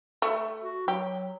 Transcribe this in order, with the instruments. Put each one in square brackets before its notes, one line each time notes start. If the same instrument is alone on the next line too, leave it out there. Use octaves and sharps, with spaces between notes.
[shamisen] A3
[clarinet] F#4
[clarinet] F#3 [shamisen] G4